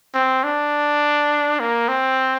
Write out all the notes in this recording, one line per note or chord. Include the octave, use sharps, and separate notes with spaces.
C4
D4
A#3
C4